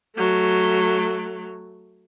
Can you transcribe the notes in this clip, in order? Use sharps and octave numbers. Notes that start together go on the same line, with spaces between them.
F#3 A3